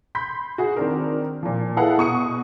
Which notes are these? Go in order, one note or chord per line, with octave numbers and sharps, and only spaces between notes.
B5 C6 G6 B6
F#4 G#4
D#3 C4 D4 A#4
A#2 F3
E4 G#4 A4 B4 F5 F#5
B2 C#6 D#6 C#7